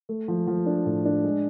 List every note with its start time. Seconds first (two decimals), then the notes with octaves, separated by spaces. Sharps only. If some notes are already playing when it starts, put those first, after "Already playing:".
0.09 A3
0.28 F3
0.47 F3
0.66 D4
0.86 A2
1.05 D4
1.24 G#3